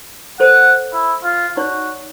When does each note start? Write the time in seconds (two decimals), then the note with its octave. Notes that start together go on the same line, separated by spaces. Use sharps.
0.40 A4 C5 F#5
0.93 E4
1.24 F4
1.57 D#4 F#4 C#5 D5